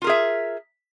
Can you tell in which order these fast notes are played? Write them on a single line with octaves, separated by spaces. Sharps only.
F4 A#4 G#4 E5